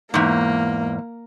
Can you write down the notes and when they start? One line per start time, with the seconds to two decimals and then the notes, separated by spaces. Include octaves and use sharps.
0.14 E2 G#2 A#3